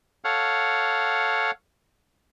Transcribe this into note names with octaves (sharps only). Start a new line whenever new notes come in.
A4 C#5 F5 F#5